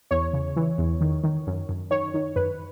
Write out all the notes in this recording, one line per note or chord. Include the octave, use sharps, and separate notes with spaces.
E2 C#5
C#3
E3
E2
D#3
D#3
F#2
F#2
D#3 C#5
D#3
F#2 B4